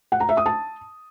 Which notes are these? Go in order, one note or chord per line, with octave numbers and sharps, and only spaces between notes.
F#5
A#5
E5
D#6
A5